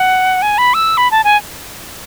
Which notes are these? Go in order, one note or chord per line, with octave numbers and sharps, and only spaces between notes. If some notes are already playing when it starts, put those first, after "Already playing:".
Already playing: F#5
G#5
B5
E6
B5
A5
G#5